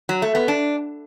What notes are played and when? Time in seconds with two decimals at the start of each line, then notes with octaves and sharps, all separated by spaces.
0.09 F#3
0.22 A3
0.35 B3
0.48 D4